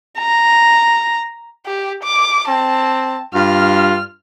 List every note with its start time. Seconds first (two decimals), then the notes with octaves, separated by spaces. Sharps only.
0.19 A#5
1.66 G4
2.04 D6
2.48 C4 A5
3.34 G2 F4 F6